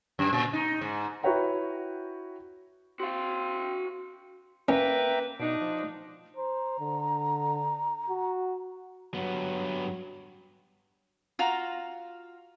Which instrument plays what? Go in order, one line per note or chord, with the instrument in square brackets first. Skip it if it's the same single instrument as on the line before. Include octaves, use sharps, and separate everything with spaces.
[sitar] F#2
A#2
D#4
G#2
[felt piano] E4 F#4 B4 C#5 G5 A#5
[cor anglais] C4 [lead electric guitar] F#4 F5
[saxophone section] A#3 B4 [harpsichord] C#4 [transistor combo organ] E5 G5 A#5
[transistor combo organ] B2 [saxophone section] D4 D#4
[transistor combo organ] F3
[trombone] C5 [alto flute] A#5
[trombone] D3
F#4
[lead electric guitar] G2 B3 [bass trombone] F#3
[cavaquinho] F4 F#4 F5 A#5